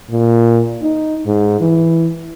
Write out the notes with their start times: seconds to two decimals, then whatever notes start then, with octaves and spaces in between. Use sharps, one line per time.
0.10 A#2
0.82 D#4
1.26 G#2
1.61 E3